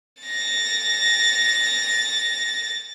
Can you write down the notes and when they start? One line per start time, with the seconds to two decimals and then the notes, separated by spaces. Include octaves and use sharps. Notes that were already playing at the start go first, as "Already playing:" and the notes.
0.23 A6 A#6